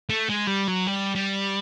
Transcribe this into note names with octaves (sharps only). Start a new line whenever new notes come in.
A3
G#3
G3
F#3
G3
G3